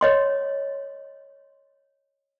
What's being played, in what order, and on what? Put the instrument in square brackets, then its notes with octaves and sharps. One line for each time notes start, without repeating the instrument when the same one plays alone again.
[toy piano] C#5 D#5 C6